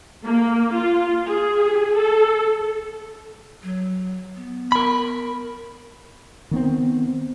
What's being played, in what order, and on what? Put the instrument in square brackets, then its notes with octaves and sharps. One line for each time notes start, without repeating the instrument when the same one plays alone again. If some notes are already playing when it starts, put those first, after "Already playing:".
[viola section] A#3
F4
G#4
A4
[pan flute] F#3
B3
[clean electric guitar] A#4 B5
[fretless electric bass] D#3 B3 C4